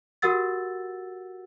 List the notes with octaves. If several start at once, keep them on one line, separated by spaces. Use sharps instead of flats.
F#4 G4 A#4 F#5 E6 A6